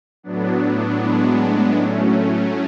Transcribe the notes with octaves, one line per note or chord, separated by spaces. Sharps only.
A2 F#3 B3 D4
G#3 B3
A2 F#3 A3 C#4